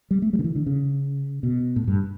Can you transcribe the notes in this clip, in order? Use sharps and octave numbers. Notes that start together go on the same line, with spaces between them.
G3
A3
G3
D3
E3
D3
C#3
B2
A2
G2